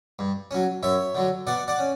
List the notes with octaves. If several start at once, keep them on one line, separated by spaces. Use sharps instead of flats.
G2
F#3 C#4
F#2 C#5 E5
D3 F#3
B2 D5 F#5
D5 F#5
C#4